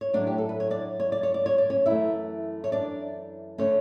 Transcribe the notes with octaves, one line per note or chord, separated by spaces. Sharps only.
C#5
A2 F#3 A3 D4 D5
G4
A4
B4
C#5
D4 D5
C#5
D5
C#5
D5
C#5
D5
C#4 C#5
F#2 E3 A3 E4 E5
C#5
D4 D5
D3 A3 C#4 C#5